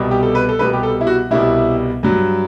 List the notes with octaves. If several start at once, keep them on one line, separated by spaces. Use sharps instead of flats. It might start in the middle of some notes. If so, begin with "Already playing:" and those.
Already playing: C2 B2 G3
G4
A4
B4
A4
C2 B2 G3 B4
G4
A4
E4
F#4
C2 B2 G3 E4
G2 F#3